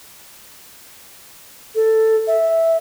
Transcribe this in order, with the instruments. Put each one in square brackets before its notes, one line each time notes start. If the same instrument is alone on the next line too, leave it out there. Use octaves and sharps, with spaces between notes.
[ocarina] A4
E5